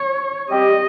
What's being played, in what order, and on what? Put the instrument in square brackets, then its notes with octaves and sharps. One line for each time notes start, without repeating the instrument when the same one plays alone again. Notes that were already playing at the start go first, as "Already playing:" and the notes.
Already playing: [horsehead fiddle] C#5
[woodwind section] G3 C4 G4 [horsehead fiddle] D#5